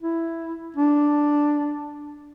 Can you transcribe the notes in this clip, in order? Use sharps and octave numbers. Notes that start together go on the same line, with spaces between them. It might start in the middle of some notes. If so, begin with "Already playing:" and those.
E4
D4